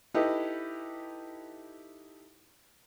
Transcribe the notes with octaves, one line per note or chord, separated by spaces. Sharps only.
D#4 E4 G4 A4 B4 D#5